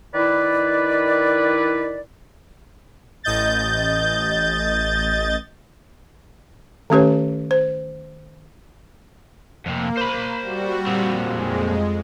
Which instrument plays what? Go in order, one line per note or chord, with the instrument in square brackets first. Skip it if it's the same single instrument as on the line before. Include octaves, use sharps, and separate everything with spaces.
[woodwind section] D#3 E4 B4 D5
[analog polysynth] A1 D#5 G6 A6
[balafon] D#3 A3 C#4 G4 B4 C#5
C5
[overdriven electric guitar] F2 C3 [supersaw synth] A#3
[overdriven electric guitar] C5 B5
[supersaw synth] G3 F#4
[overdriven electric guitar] A#2 C4
[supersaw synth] F2 G#3